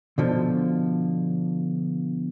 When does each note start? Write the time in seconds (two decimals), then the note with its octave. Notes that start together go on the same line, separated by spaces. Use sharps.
0.18 B2 D3 F3